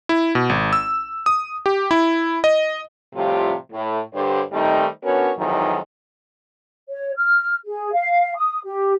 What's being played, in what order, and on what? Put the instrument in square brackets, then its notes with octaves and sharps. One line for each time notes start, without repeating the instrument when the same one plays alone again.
[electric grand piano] E4
B2
G#1
E6
D#6
G4
E4
D#5
[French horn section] A2 C3 F3 G3 F4 G4
A2
G2 D3 G4 C5 C#5
D#3 G3 A3 C4 D#4
B3 C#4 D4 F#4 A#4 C#5
F2 G#2 D#3 E3 F#3
[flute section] C#5
F6
G#4
F5
D#6
G4